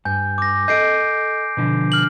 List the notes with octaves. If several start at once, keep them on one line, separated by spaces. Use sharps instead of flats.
G2 G#5 G6
D6 A#6
A4 D#5 G6 C7 D7
B2 D3 F3
F6 F#7